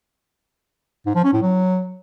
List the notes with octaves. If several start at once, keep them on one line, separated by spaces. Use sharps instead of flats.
G#2
F3
C#4
A2
F#3